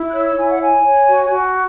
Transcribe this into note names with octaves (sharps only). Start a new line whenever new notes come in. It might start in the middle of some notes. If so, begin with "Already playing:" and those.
Already playing: E4
F#6
C#5 E6
E6
E4 G#5
F#5
C#5 G#5
C#5
F#4
F#4